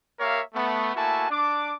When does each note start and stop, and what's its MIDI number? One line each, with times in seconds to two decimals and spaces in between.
0.20 0.41 58
0.20 0.41 67
0.20 0.41 70
0.20 0.41 73
0.20 0.41 76
0.20 0.41 77
0.55 0.95 57
0.55 0.95 59
0.95 1.29 57
0.95 1.29 58
0.95 1.29 64
0.95 1.29 66
0.95 1.29 80
0.95 1.29 81
1.30 1.73 62
1.30 1.73 86